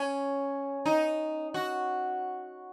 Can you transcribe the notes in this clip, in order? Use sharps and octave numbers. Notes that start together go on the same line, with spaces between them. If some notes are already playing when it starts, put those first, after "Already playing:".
Already playing: C#4
D#4
F#4